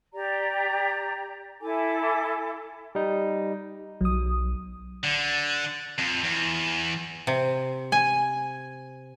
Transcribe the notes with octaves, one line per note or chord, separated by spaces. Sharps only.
G4 D5 A#5
E4 A4 G#5 D6
G3 D#4
B1 F#3 D#6
D3
F2
E2
C3
G#5